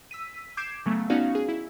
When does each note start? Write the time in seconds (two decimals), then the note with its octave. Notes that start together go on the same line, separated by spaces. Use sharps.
0.11 E6 B6 D#7
0.57 D6 G6 G#6 C7 D7 E7
0.86 C#3 F#3 A3 B3
1.10 B3 C#4 D#4 F#4 D5 F5
1.35 G#4
1.49 E4